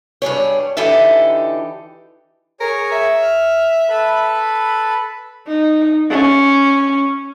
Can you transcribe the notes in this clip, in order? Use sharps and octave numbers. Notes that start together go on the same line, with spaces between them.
G2 G3 G#4 C#5
D3 E3 D#4 G4 A4 E5
G#4 A#4 C#5
E5
F6
A4 B4 B5
D#4
C#4